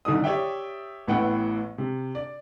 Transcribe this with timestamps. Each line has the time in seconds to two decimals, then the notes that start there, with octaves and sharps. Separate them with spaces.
0.05 C2 D3 D#3 D#6
0.24 G4 C#5 D5 E5 G5
1.08 A1 A2 B3 E4 F#5 G5
1.78 C3
2.15 D5